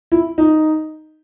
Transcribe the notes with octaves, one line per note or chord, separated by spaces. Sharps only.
E4
D#4